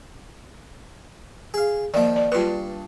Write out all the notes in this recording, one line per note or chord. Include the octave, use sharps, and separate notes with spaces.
G#4 F5
D#3 F3 A#3 D5
D5
G2 F4 B4 C6 C#6